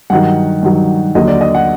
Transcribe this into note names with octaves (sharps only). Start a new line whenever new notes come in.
G2 D#3 F#3 F#5
G2 D#3 F#3
D#2 D3 F#3 D#5
D5
D#5
F#5